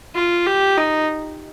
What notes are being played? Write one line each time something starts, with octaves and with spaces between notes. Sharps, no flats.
F4
G4
D#4